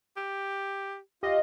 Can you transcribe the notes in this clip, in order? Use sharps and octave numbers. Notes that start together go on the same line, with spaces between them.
G4
F4 G4 D#5 F5